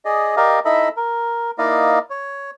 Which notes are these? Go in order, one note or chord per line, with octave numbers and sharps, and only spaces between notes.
G#4 D5 D#5
G4 A#4 D5 D#5 F5
D#4 E4 A4 D#5 E5 B5
A#4
A#3 D#4 E4 D5 D#5 F5
C#5